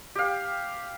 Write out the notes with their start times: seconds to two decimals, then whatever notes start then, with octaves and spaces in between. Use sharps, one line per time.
0.15 G4 F5